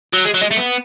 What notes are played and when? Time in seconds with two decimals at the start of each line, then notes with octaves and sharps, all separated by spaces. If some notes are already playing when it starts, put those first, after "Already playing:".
0.13 F#3
0.25 G#3
0.34 F#3
0.41 G#3
0.51 A3
0.57 B3